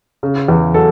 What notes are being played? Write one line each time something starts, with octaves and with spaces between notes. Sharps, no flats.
C#3
E2
F#3 A4